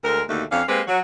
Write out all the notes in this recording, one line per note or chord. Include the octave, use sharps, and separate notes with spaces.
D2 G#3 A3 A#4
D#2 B2 D3 A3
F2 C#4 D4 F5
G#3 A#3 C4 G4 B4 C5
F#3